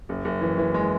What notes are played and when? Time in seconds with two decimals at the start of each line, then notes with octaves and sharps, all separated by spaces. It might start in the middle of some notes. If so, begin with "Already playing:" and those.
0.09 F#1
0.25 F#1
0.41 E3
0.58 E3
0.74 G#3